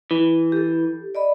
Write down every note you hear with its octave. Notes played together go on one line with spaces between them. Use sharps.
E3
G4 A4
D5 D#5 B5